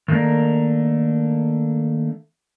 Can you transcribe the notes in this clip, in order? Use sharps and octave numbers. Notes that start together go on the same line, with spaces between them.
D#3 A3 A#3 D4 A#4